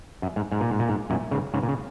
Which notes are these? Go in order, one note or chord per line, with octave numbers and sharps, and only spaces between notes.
F#2
G#2
G#2
A#2
G#2
A#2
G#2
F#2 A#2
G#2 C#3
G#2 C#3
A#2
C#3